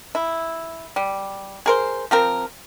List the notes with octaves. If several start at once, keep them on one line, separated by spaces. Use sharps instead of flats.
E4
G3
G#4 A#4 C5
F3 C4 A#4